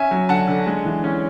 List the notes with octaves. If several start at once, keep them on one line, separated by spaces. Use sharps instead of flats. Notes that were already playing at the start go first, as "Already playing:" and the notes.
Already playing: C#4 E5 G#5
F#3
D3 F#5 A5
D3
G#3
E3
C#4